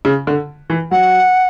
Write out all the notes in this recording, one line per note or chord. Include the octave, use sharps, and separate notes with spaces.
C#3
D3
E3
F#3 F#5